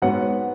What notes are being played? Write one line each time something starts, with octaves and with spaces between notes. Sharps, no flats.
G#2 F#3 B3 F#5